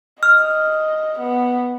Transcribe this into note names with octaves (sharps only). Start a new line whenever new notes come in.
D#5 F6
B3